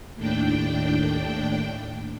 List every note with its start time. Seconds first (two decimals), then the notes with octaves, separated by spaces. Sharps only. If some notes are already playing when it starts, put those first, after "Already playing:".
0.15 D#2 A2 D4 G5